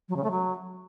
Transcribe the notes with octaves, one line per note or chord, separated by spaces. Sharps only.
F#3
C#3
A3
F#3